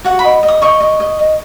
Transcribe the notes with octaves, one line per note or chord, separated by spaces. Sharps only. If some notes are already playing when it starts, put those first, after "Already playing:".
F#4 F#5
B5
D#5
D#5
D#6
D#5 C#6
D#5
D#5
D#5